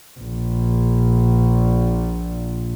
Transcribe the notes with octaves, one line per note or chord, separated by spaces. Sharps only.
A#1 A#2